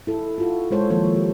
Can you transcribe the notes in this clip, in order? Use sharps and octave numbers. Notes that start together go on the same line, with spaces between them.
E4 A4
F4 F#4 A4
G#3 A4 C5 C#5
D#3 F3 A#3 A4 C5
G4